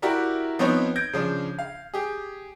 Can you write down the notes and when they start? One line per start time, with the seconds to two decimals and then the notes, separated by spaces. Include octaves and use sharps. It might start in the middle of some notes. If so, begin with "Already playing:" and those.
0.02 E4 F#4 G4 A#4 D5 E5
0.59 F3 B3 C4 D#4 C#5
0.96 G6 G#6 A#6 D7
1.13 C#3 F3 D4
1.59 F5
1.94 G4 G#4